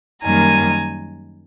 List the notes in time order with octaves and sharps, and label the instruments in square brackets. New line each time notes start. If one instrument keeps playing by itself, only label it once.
[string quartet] F#2 D#3 G3 A#3 G#5 A#5